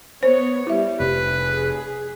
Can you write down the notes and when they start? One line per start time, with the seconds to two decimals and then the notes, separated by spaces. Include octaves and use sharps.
0.23 B3 C5 C#5
0.67 G3 E4 E5
1.00 F1 C3 B4
1.40 G#4